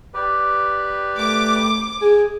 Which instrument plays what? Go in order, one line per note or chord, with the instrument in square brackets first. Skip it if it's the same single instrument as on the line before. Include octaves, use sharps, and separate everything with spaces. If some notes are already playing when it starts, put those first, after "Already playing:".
[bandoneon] G4 B4 D5
[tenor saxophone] A3 [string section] D6
[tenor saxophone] G#4